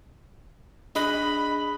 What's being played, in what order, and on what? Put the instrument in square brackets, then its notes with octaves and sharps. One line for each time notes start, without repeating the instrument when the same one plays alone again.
[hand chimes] D4 G#4 F#6 [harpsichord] D#5 [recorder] B5